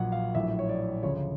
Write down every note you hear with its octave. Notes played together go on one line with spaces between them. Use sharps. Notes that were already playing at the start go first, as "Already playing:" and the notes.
Already playing: A#1 A#2 F#3 F#5
F5
A#1 A2 F#3 E5
C#5
D5
D2 C#3 F3 C#5